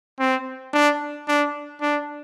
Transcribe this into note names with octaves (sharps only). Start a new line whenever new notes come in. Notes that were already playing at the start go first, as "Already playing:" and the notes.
C4
D4
D4
D4